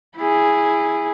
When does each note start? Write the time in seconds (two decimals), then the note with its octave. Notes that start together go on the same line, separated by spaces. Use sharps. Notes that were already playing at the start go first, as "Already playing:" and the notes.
0.17 E4 G#4